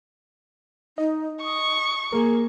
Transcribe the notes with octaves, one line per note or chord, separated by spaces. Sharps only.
D#4 D#5
C#6 D#6
A#3 G#4 A#4